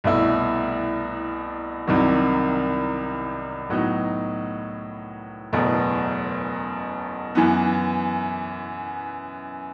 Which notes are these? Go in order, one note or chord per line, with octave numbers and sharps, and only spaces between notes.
C2 B2 A3 E4
C2 C3 D#3 F#3
A2 F#3 B3 D#4
F#1 E2 B2 A3
F#2 E3 B3